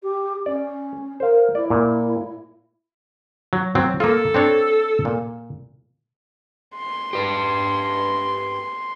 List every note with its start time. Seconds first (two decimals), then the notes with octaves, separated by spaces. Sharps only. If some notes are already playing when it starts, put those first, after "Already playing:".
0.03 G4
0.46 C#4 D5
1.20 A#4 C5 F5
1.55 E4 D5
1.70 A#2
3.53 F#3
3.75 F#3 C4
4.00 A#3 F4 A4
4.34 C4 D4 C#5
5.05 A#2
6.77 C6
7.13 G4 B4